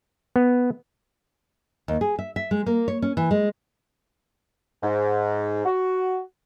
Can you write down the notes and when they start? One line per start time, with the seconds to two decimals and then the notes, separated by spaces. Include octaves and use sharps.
0.36 B3
1.88 D#2
2.01 G#4
2.19 E5
2.36 E5
2.51 G#3
2.66 A#3
2.88 C#5
3.02 C#4
3.17 E3
3.31 G#3
4.82 G#2
5.65 F#4